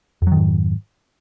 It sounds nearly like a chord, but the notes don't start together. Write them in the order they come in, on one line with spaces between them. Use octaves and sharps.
F2 F#3 D#3 G#2